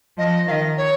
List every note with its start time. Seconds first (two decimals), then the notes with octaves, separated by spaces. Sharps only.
0.17 F3 D#5
0.47 D#3 F5
0.51 D#5
0.77 C#5